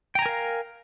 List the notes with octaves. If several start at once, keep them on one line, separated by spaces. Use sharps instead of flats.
A#4 F5 G5 G#5 A#5